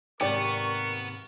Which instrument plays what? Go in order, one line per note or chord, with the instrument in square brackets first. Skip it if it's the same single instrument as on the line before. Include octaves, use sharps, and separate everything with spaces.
[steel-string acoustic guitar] D#2 G#2 C3 [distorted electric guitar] B3 [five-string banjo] G4 D5 [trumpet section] A#4 C#6